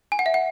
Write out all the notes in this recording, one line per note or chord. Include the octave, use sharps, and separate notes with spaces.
G#5
F#5
E5
F#5